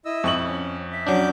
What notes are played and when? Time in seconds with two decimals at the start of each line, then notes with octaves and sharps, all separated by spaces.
0.05 E4 D#5 E6
0.24 F2 C#6 F#7
0.47 C#4
0.92 E5
1.07 F#3 C#4 D4 D6 G6